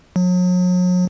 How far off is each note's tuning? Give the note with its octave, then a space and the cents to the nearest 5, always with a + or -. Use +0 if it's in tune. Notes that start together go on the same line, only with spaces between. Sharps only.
F#3 -40